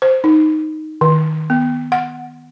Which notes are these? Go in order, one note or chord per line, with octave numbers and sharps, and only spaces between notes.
C5
D#4
D#3
B3
F#5